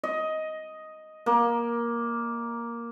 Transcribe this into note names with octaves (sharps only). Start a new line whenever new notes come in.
D#5
A#3